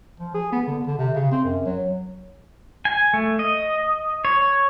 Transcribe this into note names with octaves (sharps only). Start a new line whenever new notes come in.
F3
G#4
B3
D3
D3
C3
C#3
C4
F#2
F#3
G#5
A3
D#5
C#5